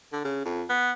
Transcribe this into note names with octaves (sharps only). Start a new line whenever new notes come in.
D3
C#3
F2
B3